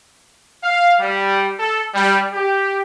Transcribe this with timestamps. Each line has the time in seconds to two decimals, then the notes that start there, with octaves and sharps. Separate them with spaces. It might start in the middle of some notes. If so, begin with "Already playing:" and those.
0.64 F5
1.00 G3
1.60 A4
1.95 G3
2.34 G4